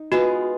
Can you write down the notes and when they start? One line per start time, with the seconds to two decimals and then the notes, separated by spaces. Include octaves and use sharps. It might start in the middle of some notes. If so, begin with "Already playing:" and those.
Already playing: D#4
0.12 G#3 B3 F4 F#4 G#4